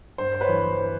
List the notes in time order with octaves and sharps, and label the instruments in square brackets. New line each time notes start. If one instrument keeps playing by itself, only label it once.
[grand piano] G2 C5
C5
B4 C#5
E3
C5
C5